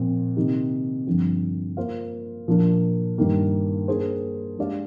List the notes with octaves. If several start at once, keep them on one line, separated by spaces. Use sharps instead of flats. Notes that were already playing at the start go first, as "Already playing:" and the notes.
Already playing: A#2 F3 C4
C3 D#3 A#3 D#4 G4
G2 D3 F3 C4
A#3 F4 C5 F5
A#2 F3 A#3 D4
G2 D#3 A#3
A#3 D4 G#4 C5
G#3 D4 G4 D5 F5